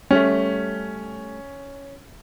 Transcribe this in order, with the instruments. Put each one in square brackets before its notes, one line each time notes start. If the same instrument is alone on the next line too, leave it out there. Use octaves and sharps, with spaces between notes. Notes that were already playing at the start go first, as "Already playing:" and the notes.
[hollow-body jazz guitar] G3 A3 [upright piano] C#4